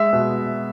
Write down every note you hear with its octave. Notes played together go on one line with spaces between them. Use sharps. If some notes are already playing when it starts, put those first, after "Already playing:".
Already playing: G#3 E5
B2